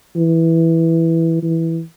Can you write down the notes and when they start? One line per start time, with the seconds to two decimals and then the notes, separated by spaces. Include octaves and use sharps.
0.16 E3
1.43 E3